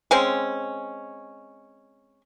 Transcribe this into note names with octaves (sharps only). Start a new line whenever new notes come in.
G#3 C4 C#4